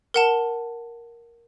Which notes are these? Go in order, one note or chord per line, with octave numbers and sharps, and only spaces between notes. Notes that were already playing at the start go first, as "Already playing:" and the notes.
A#4 F#5 A5